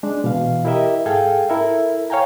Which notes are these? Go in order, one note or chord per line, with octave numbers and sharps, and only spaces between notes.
G#3 D4
B2 E3 F5
E4 G4 A#4 D#5 E5
G#2 G#4 A4 F5 G5 G#6
E4 A4 A#4 E5
C#5 F5 G5 G#5 A#5